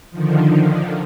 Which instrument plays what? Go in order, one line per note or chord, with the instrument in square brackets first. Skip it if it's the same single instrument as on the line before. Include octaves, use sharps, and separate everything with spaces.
[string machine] D3 D#3 F3